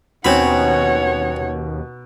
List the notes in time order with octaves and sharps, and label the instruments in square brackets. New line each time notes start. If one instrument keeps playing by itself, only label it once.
[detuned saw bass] D#2 [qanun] B2 C#4 D#4 [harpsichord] C4 B5 [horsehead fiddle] C#5 F#5